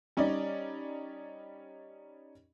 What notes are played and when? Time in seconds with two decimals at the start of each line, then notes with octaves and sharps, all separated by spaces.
0.17 G3 C#4 D#4 D5